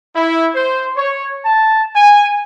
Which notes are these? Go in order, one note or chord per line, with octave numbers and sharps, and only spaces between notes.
E4
C5
C#5
A5
G#5